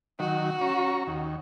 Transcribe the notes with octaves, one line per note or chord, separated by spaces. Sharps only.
D#3 F#3 F#4
C#4 A#5 C#6
D#2